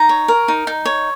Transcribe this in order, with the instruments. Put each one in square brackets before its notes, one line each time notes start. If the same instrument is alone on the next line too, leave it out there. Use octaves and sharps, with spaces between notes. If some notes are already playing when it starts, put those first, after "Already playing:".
Already playing: [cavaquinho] D#4 A#5
C#5
A#4
D#4
D#4
C#5